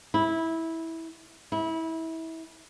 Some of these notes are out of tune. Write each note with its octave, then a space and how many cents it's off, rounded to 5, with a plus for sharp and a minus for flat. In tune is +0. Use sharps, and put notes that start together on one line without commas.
E4 -15
E4 -25